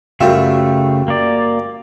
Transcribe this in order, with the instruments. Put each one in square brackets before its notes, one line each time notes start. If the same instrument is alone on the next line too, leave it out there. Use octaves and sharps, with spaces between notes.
[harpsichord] F#2 G3 F4 [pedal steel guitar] C#3 A3 E5
[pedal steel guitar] A#3 D5